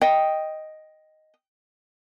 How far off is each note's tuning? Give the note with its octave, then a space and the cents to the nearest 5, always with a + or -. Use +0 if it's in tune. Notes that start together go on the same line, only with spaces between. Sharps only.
D#5 +0 G5 +0